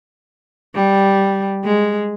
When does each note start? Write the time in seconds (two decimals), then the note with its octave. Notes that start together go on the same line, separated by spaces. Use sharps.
0.75 G3
1.64 G#3